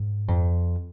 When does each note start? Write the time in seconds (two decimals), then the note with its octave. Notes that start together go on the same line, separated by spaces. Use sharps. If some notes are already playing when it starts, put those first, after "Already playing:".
Already playing: G#2
0.28 F2